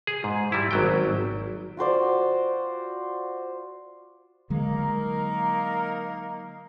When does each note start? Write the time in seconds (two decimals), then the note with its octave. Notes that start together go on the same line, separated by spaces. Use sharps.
0.07 G#4
0.24 G#2
0.52 G3 E4
0.71 G#1 F#3 G5
1.77 F4 F#4 C5 D5
4.50 D3 F#3 G#3 A#3 D#4 A#4